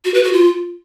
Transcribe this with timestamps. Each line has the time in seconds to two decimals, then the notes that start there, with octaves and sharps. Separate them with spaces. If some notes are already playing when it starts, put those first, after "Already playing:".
0.05 F#4
0.14 B4
0.23 F#4
0.33 F4